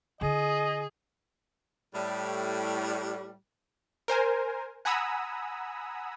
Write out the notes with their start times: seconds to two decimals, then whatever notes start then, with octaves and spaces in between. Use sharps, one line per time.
0.21 D3 E4 G#4 D#5
1.94 A2 G3
4.08 A#4 C5 G#5
4.85 F#5 G#5 A#5 B5 D#6 E6